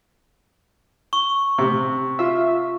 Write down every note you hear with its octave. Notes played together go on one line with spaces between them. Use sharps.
C#6
C3
F4 E5